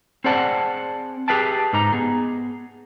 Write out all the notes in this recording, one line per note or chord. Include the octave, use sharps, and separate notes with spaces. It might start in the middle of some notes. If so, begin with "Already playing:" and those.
C4 G#4 C5 D5 F#5 A5
G4 G#4 B4 E5 G5 A5
G#2 D#4 G4 A#5
B3 G#4